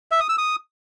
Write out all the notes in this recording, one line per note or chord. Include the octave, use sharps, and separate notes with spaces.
E5
D#6
E6
D#6